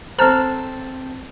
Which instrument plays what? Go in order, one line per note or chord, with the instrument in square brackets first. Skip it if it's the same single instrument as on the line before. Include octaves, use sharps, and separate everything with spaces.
[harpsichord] C4 A4 [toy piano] C5 [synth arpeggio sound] A#5 F6